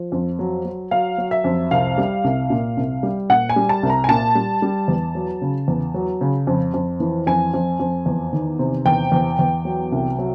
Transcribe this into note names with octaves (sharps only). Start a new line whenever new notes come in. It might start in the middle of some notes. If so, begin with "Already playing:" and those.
Already playing: F3
F2
F#3
F#3
F#3 F5
F#3
E5
F2
C2 F5
G3
C2
A#2
C2
G3
A#2 F#5
G#5
G3
A5
C2
A#5
G#5
A#2 A5
G3
G3
E2
F#3
C#3
E2
F#3
C#3
F2
F2
E3
F2 G#5
F2
F2
E2
D#3
C3
E2 G5
E2
E2
F#3
C2
F#3